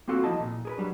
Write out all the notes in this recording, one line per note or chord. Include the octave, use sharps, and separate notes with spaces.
A#3 C4 F4 F#4 A4
F3 E4 D#5 A5
A#2
G#4 A#4 B4
F#3 G3 D4